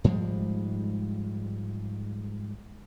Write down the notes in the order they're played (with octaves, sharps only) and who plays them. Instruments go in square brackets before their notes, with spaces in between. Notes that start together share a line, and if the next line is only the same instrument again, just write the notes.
[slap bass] G#2 F3 G3 G#3